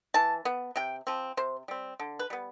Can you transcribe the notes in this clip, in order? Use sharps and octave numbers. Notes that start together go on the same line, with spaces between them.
E3 A5
B3
C3 G5
F3 C4
C3 C5
G3 C4
D3
B4
G3 B3